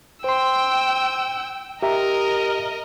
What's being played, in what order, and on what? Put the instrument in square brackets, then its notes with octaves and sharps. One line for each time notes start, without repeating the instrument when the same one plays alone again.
[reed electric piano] C5 C6 [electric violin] G5 E6
[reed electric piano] G4 E5 A#5 [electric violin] A#4 D#5